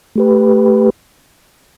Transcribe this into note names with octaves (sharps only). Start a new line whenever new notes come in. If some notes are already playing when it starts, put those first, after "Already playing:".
A3 G4 B4